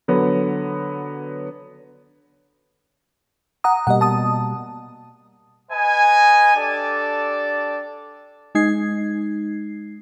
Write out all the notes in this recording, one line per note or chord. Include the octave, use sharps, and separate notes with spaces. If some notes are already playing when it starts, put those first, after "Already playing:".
D3 F#3 B3
F#5 A#5 D#6
B2 G3 A#3 D#5 F#5
A5 D#6
B4 D#5 G#5
D4 G4 A4 D5 A5
G#3 D#4 G#6 C7